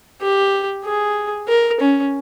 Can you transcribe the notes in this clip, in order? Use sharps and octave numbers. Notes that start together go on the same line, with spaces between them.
G4
G#4
A#4
C#4